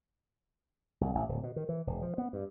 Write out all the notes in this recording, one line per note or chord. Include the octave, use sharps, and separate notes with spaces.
C2
A1
D1
B2
D#3
E3
E1
F3
B3
G2